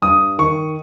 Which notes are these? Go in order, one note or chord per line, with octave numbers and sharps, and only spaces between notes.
G2 D#6
D#3 C#6